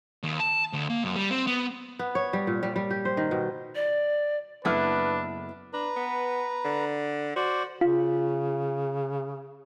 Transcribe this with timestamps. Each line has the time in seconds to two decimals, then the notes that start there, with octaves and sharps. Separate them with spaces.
0.23 D#2
0.40 A5
0.73 D2
0.90 A#3
1.03 F#2
1.16 G3
1.30 C4
1.47 B3
1.99 B3
2.15 C#5
2.33 G3
2.47 A#2
2.63 G3
2.76 G3
2.91 G4
3.05 C5
3.17 D#3
3.31 B2
3.75 D5
4.65 F#1 B3 D4 E4 A4 B4 E6 F6
5.73 D4 B4 A#5
5.96 B3
6.64 D3
7.36 F#4 C5 D5
7.81 C#3 F4